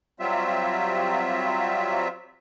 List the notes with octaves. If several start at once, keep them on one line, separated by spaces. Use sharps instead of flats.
F#3 G3 C4 F4 E5